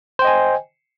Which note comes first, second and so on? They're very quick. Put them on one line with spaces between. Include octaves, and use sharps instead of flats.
C5 G5 D#5 G#5